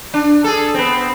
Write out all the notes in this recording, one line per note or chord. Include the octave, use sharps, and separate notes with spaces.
D4
G#4 A4
B3 C4